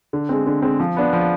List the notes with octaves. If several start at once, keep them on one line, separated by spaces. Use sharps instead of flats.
D3
G#3 C4
D3
G#3 C4
F3
B3 D4
F3